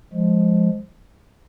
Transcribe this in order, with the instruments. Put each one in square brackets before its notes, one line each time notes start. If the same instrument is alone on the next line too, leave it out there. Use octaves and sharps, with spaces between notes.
[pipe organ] F3 G#3